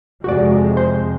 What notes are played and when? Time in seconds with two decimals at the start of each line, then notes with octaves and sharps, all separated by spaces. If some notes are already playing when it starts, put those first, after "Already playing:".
0.24 F2 C3 G#3 F#4 D5
0.77 C5